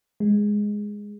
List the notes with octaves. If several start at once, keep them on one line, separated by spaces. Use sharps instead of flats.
G#3